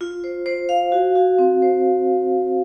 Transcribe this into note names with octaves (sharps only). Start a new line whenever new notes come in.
F4
C5
C5
F5
F#4
F#4
C4
C5